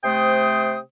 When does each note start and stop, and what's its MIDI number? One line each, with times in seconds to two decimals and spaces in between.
0.04 0.79 48
0.04 0.79 57
0.04 0.79 72
0.04 0.79 79
0.04 0.79 87